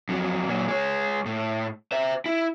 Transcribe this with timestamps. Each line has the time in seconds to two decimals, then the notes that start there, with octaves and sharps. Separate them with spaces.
0.09 F2 F#3
0.48 A#2 F#3
0.68 G#3 C#5
1.26 A2
1.92 C5 E5
2.26 E4